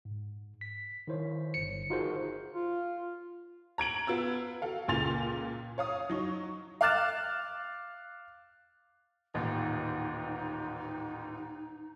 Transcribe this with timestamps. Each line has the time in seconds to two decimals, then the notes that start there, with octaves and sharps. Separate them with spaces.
0.05 G#2
0.61 B6
1.07 D#3 E4 C5 C#5
1.54 G1 C#7
1.90 D#4 F4 F#4 G#4 A#4 C5
2.53 F4
3.78 A#5 G#6 D7 F#7
4.07 B3 F4 E6 G#6
4.62 F#4 A4 F5
4.88 C#2 A#2 G#5 C6 A6 F7
5.78 C#5 F5 D#6
6.10 F#3 D#4 C#6
6.81 F5 D6 F6 F#6 A6 E7
9.34 D#1 A1 D#2 D#4